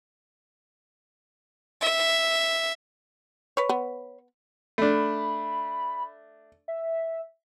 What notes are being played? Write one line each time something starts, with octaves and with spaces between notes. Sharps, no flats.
E5
B4 C#5
B3
A3 D4 B5
E5